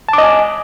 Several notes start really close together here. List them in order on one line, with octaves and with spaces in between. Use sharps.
A5 D6 D#5 G#5